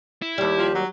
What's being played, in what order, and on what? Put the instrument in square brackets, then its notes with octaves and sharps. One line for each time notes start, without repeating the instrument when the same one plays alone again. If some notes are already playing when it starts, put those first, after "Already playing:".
[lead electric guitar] E4
[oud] D#2 G3 [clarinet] G4
[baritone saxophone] F3
F#3